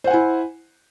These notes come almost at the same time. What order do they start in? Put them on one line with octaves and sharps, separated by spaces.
C5 F#5 G#5 E4